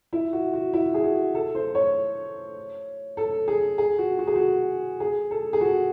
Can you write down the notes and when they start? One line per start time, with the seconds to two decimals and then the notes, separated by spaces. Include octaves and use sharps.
0.13 E4
0.33 F#4
0.54 F#4
0.73 E4
0.94 G#4
1.04 F#4
1.35 A4
1.55 C5
1.75 C#5
3.17 A4
3.48 G#4
3.78 G#4
3.98 F#4
4.19 F#4
4.27 G#4
4.36 F#4
5.00 G#4
5.31 A4
5.53 G#4
5.61 F#4